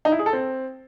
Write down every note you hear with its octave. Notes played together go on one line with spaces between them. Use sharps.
D#4
E4
G#4
A4
C4